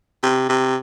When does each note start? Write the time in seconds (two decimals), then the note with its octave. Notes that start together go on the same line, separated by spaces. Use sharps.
0.23 C3
0.49 C3